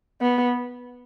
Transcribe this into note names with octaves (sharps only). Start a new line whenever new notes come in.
B3